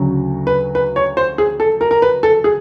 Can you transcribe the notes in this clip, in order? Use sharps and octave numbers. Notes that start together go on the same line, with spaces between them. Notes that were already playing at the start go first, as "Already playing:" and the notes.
Already playing: D2 C#3 F#3
B4
B4
C#5
C5
G#4
A4
A#4
A#4
B4
A4
G#4